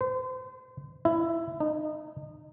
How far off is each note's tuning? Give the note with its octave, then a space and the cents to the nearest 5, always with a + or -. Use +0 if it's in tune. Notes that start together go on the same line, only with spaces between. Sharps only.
C5 -35
E4 +15
D#4 -25